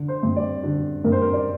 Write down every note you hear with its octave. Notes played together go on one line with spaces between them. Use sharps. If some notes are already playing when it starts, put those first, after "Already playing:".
Already playing: D3
C5
G2
D5
D3
G2 A#4
C5
A#4
D5